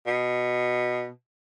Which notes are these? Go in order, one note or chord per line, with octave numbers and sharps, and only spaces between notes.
B2